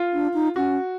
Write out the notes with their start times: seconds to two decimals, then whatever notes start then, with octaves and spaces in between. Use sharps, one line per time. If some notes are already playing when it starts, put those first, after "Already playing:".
Already playing: F4
0.13 D4
0.34 D#4
0.56 C#4 F#4